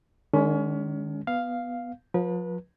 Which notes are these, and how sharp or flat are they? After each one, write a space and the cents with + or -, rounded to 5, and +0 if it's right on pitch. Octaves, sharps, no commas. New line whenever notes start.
D#3 -30 G#3 +0 C#4 +30
B3 +0 F5 +0
F3 +35 B4 -30